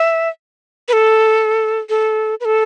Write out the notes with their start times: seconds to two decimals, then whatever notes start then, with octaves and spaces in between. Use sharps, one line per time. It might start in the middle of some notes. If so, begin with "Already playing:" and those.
Already playing: E5
0.88 B4
0.93 A4
1.89 A4
2.40 B4
2.45 A4